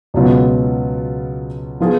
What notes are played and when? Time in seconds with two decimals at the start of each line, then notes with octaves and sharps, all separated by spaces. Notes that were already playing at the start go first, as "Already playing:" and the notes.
0.14 C#2 B2 F#3 B3 F4
1.80 F3 B3 F4 G#4